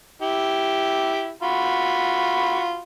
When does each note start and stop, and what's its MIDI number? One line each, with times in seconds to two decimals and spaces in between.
0.22 1.31 64
0.22 1.31 67
1.42 2.80 65
1.42 2.80 66
1.42 2.80 83